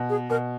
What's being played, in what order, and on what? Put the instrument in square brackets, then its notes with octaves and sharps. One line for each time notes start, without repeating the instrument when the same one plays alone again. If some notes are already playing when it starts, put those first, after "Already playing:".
Already playing: [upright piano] B2
[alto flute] G#4
[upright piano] B2 [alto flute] A#4